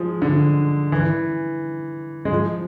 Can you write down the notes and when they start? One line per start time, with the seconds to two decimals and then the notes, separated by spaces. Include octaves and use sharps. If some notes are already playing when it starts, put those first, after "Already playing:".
Already playing: F3 G#3
0.22 D3
0.92 E3
2.25 G#3
2.31 F3